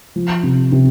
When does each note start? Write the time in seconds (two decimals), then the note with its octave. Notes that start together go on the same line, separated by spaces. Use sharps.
0.16 F3
0.43 C3
0.72 C3